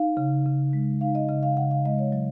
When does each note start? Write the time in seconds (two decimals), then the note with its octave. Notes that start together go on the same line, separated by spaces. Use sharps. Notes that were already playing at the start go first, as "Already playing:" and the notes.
Already playing: D#4 F5
0.17 C#3
0.46 C#3
0.73 G#3
1.01 D#4 F5
1.15 D#5
1.29 C#3 D#5
1.43 F5
1.57 C#3 F#5
1.71 F5
1.85 G#3 D#5
1.99 C#5
2.12 F#3